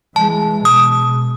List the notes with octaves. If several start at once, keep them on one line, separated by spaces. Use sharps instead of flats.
E3 G#3 A5
B2 D#6